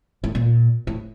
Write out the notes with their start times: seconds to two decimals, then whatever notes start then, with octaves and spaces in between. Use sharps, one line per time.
0.24 A2
0.35 A#2
0.87 A2